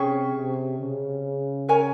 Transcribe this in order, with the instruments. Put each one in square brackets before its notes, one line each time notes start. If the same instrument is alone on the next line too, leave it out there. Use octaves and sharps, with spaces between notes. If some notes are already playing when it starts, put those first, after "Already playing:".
Already playing: [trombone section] C3 [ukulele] C#4 G#4 C#5 G5
[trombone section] C3
C#3
[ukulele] A#4 C#5 G#5